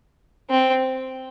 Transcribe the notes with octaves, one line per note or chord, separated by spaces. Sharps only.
C4